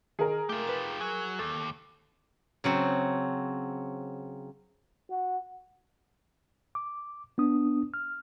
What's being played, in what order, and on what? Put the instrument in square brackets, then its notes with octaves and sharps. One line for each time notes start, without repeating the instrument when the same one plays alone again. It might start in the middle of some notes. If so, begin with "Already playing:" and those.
[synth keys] D#3 [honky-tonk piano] G#4 A#4
[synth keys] A3 [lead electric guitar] F4 G4
[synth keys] B4 A6
[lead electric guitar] F#3 [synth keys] G#5
[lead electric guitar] D#2 [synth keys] A4
[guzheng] C#3 F#3 C4
[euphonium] F#4
[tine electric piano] D6
B3 D4 D#6
F6